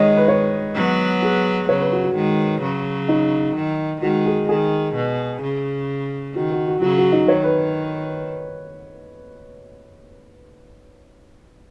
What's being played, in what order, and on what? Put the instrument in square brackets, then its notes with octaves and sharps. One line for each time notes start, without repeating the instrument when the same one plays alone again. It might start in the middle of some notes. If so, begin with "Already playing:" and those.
Already playing: [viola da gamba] D#3 G#3 [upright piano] C#5 D#5
[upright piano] B4
C#5
[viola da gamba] F#3 B3
[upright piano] G#4
[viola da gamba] C#3 F#3 [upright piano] C#5
[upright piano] B4
F#4
F#4
[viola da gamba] D#3 G#3
C#3 F#3
[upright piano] D#4
[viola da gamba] D#3
[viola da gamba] D#3 G#3 [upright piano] F#4
[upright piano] G#4
[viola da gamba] D#3 [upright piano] G#4
[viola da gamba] B2
C#3
[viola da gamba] D#3 [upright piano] F#4
[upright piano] F#4
F#4
[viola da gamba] C#3 F#3 [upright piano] F#4
[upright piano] F#4
D#4
[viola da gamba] D#3 [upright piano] C#5
[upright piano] B4